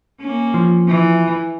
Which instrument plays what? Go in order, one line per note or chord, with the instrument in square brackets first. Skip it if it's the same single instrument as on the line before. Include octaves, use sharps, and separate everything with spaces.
[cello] A#3 C#4
[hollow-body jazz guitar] F3
[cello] E3